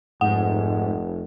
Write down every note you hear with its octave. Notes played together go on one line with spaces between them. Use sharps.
F1 G#2 F#5